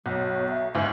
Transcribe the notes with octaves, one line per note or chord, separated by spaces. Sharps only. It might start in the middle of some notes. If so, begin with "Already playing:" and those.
B1 F#3
E5
C#2 G#2 C#4 E4